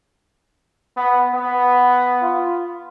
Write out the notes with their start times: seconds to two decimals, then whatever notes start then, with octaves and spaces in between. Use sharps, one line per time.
0.97 B3
1.34 B3
2.22 F4